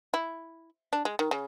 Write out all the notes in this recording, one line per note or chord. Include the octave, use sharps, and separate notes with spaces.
E4
D4
G#3
D#3
C#3